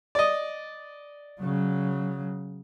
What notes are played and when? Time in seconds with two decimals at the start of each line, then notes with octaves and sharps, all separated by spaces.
0.15 D5 D#5
1.40 C#3 F#3